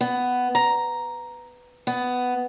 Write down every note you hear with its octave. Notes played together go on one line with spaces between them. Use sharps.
B3
A#5
B3